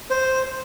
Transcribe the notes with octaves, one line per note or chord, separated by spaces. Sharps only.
C5